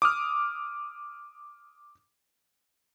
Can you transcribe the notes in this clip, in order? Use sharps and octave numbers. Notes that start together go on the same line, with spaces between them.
D6 D#6 F6